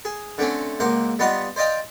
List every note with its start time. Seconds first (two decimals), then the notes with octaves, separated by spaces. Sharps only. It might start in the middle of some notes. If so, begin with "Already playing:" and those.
0.05 G#4
0.38 D3 A3 C4 C#4
0.80 C#2 A#3 C5 F#5
1.19 G3 B3 F4 D#5 F#5
1.56 C5 D5 D#5 F5 G5